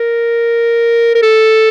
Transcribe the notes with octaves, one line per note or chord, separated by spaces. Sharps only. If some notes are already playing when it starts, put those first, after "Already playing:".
Already playing: A#4
A#4
A4